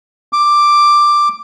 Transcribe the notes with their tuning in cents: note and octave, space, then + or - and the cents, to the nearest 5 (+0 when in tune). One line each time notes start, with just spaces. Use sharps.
D6 +5